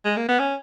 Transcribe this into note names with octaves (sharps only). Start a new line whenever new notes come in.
G#3
A#3
B3
C#4